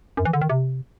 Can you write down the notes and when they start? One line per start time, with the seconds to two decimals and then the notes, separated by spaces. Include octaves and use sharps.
0.17 F#2
0.25 E3
0.33 D3
0.41 D#3
0.50 C3